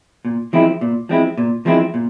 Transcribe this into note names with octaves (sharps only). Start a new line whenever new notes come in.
A#2
F3 G#3 C4 E4
A#2
F3 G#3 C4 E4
A#2
F3 G#3 C4 E4
A#2